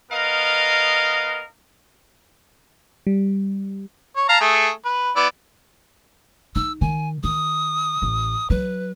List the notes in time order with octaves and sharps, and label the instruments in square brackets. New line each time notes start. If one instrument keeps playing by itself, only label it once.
[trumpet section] B3 A#4 D#5 F5
[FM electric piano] G3
[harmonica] C#5
F5 A5 A#5
A3 G#4
B4
B3 E4 D5
[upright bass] D#4 [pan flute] E6
[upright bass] D#3 [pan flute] G#5
[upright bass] D#3 [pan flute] D#6
[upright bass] A1
[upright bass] F#3 [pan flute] B4